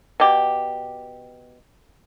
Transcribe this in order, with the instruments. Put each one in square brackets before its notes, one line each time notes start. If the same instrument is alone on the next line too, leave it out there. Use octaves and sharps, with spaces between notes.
[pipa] B2 G4